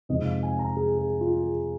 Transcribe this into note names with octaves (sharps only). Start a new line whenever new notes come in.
F2 C3 G#3 D#4 D#5
F5
G#5
A#5
G#4
G#4
F4
G#4